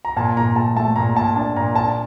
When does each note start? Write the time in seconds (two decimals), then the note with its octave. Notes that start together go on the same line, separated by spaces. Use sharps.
0.05 A#5
0.16 A#2 A5
0.37 A#2 A#5
0.56 A#2 A5
0.76 A3 A5
0.96 A#2 A#5
1.16 A#2 A5
1.36 D4 A5
1.56 A#2 A#5
1.76 D4 A5